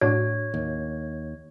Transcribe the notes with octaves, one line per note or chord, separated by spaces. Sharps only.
A2 D4 F#4 C#5
D#2